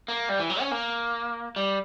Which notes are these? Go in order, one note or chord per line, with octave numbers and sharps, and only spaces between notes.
A#3
G3
E3
F#3
C#4
A#3
G3